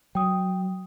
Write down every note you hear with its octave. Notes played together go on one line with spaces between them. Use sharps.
F#3 G5 D#6